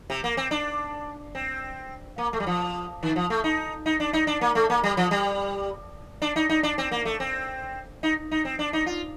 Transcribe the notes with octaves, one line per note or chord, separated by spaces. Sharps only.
C3
A#3
C4
D4
C4
A#3
A3
G3
F3
D#3
F3
A3
D#4
D#4
D4
D#4
D4
A#3
A3
A#3
G3
F3
G3
D4
D#4
D#4
D4
C4
A#3
A3
C4
D#4
D#4
C4
D4
D#4
F4